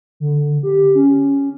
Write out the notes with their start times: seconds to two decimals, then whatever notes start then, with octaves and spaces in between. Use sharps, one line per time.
0.20 D3
0.63 G4
0.95 C#4